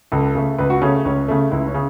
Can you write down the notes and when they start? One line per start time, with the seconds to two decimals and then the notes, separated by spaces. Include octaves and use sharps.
0.12 C#2 A4
0.35 C#3 A3
0.58 C#2 B4
0.70 F#4
0.81 C#3 A3 C#4
1.05 C#2 C#4
1.28 C#3 A3
1.51 C#2 E4
1.67 C#4
1.74 C#3